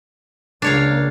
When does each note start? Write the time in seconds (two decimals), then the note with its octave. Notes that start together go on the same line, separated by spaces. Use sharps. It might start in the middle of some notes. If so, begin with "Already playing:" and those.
0.62 C#2 A#3 D4 C#5 F5